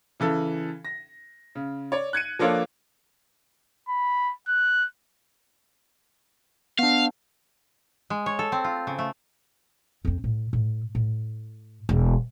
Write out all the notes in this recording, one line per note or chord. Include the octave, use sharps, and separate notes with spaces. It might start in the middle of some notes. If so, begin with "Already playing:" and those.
C#3 E3 A4
A#6
C#3
C#5 D5
F#6 G#6 C#7 D#7
F3 A#3 D4 A4 C#5
B5
F#6
B3 D4 F5
G#3
C#5
A4
C4
F4
C#3
A3
F2 C4
A2
A2
A2
E1